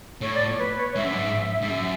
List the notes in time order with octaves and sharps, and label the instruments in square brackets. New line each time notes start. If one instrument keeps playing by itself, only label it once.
[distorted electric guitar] A2 [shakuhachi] C#5
[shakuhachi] D5
C#5
B4
C#5
[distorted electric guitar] G#2 [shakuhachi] E5
[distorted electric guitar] F#2
G#2
G#2
[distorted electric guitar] F#2 [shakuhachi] E5